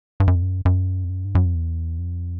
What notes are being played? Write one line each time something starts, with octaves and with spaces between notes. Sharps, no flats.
G2
F#2
F2
F#2
F#2
F2
F#2
G2
F#2
F2
E2
F2